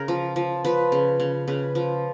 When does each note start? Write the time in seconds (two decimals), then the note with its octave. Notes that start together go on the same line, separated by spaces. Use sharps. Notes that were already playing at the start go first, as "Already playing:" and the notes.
Already playing: C#3 A#4
0.08 F3
0.36 F3
0.64 F3 B4
0.92 C#3
1.20 C#3
1.48 C#3 B4
1.75 F3